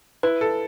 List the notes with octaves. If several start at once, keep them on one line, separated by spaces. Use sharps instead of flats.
E4 B4
A4